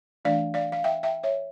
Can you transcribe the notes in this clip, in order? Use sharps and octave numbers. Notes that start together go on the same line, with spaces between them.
E3 A3 D4 D5 F5
D5 F5
F5
E5 G5
E5 G5
C#5 E5